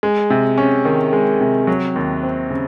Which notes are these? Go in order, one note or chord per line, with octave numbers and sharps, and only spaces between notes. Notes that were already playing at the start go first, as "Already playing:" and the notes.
G#3
C3
C#4
D#3
G#3
C3
F#3
D#2
C4
C#3